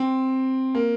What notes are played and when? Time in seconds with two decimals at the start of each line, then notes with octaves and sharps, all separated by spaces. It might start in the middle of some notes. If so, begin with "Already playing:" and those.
Already playing: C4
0.75 A#3